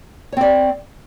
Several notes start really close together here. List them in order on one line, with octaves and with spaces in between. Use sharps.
C#5 C4 D5